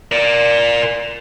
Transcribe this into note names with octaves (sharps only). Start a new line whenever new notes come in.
A#4 D5